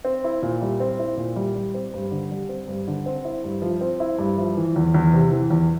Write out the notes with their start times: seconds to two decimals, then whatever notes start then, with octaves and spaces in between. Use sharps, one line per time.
0.05 C4
0.24 E4
0.42 A#2
0.62 G3
0.80 C4
0.99 E4
1.17 A#2
1.36 G3
1.56 G3
1.74 C4
1.94 G2
2.11 D3
2.31 G3
2.49 C4
2.68 G2
2.88 D3
3.06 C4
3.25 E4
3.44 G2
3.62 F3
3.81 C4
4.00 E4
4.19 G2
4.37 F3
4.57 E3
4.76 E2
4.94 E2
5.14 C3
5.32 E3
5.51 E2